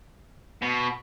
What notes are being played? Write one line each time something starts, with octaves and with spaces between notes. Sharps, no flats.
B2